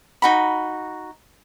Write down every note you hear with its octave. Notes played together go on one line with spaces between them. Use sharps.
D#4 F#4 B5